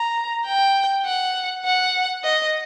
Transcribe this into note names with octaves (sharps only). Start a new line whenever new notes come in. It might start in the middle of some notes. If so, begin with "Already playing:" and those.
Already playing: A#5
G5
F#5
F#5
D#5